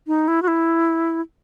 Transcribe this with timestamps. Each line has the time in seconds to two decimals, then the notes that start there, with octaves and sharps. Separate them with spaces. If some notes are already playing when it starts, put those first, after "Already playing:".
0.07 D#4
0.28 E4
0.42 F#4
0.48 E4